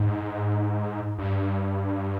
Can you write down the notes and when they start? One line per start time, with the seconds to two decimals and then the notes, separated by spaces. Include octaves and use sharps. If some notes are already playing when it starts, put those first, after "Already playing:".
Already playing: G#2
1.19 G2